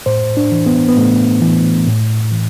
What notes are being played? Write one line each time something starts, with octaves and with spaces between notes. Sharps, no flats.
A2 C5
D4
E3
B3
B3
A2 A3
E3
A2
E3